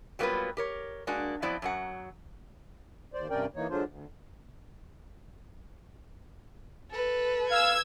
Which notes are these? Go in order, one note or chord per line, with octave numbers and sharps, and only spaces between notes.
F#3 G3 A#3 B3 F4 B4
G4 A#4 C#5
G#3 A#3 D4 F#4
F3 F#3 B3 C4 E4 D5
F#2 F#3 F#5
D#2 C5 D5
G2 C3 C#4 A#4 D5 G5
E3 A#3 D#4 C#5
D3 F#3 G#3 D4 F4 C5
D2
A4 B4
F5 E6 G#6